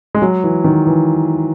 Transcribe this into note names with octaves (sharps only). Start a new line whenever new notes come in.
G#3
F#3
E3
D#3
E3